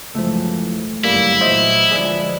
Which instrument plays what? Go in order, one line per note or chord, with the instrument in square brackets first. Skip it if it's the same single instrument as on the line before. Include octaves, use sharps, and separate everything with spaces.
[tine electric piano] C#2 F3 [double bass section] F#2 E3 [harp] A3
[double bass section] G1 C#2 F#2 [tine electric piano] G3 A#3 [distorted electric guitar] E4
[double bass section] A#2 E3 F#3 [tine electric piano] C5 D#5 E5
[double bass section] D2 F3 G#3 [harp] G#4 B4 D5